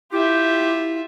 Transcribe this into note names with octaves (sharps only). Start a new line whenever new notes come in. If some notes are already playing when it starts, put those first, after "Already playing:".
E4 F4 G4 E5